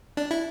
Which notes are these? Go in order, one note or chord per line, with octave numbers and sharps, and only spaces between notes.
D4
E4